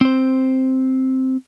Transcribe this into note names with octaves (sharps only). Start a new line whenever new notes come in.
C4 C5